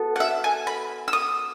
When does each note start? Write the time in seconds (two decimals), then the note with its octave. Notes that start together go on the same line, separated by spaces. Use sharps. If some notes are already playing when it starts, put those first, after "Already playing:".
Already playing: B3 F#4 A4
0.16 F#5
0.20 E5
0.44 G#5
0.67 B5
1.08 E6
1.13 D#6